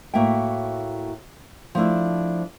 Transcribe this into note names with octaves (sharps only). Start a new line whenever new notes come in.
A2 A#3 F#4 E5 G5
F3 A3 D4 E4